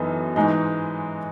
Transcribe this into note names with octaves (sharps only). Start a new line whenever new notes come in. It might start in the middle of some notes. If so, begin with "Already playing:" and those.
Already playing: F#2 E3 B3 D#4 A4
G#2 E3 G#3 D#4